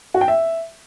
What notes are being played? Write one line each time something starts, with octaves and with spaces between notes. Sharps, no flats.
F#4
G5
E5